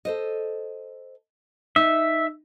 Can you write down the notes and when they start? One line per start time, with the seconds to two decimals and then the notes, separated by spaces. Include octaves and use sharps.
0.05 A4 C5 D#5
1.76 D#4 E5